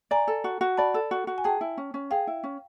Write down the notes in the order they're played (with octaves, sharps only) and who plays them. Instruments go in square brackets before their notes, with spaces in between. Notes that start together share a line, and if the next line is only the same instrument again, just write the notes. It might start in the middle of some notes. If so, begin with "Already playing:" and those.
[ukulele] D5 [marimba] G#5 A#5
[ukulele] A4
F#4
F#4
[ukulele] D5 [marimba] A5 B5
[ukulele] A4
F#4
F#4
[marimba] G#5
[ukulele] G#4 [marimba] G5 A5
[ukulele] E4
C#4
C#4
[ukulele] G#4 [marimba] F5 G5
[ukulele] E4
C#4